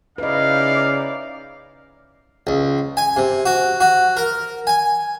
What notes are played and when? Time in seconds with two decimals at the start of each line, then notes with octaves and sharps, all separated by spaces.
0.18 C#3 D#4 E4 B4 D5 D#5 F5
2.47 C#2
2.97 G#5
3.17 C3
3.46 F#4
3.80 F#4
4.17 A#4
4.67 G#5